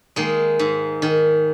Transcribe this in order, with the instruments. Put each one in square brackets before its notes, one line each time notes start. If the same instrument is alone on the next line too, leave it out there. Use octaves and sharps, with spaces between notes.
[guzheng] D#3 G#3 A#3
G#2
D#3